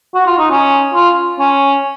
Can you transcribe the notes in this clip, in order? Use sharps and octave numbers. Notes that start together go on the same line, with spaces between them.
F#4
F4
D#4
C#4
F4
C#4